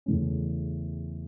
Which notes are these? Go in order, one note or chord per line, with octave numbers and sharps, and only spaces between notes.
E2 C#3 E3 A3 C#4